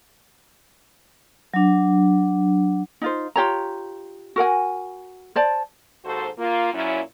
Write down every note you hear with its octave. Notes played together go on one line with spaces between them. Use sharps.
F#3 D4
D#4 F4 C5
F4 G4 C#5 A#5
F#4 A#4 F#5 G#5
C5 D5 A5
D#2 G#2 F#4 A4 C5
A#3 F4
F#2 A#2 F#3 C#4 E4